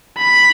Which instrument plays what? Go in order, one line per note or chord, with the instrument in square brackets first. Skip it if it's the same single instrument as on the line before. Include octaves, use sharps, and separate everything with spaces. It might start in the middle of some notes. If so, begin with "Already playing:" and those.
[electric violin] B5